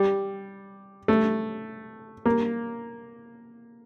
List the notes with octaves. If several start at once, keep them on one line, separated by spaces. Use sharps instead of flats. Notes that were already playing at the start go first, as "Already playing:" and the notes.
Already playing: G3
A3
A#3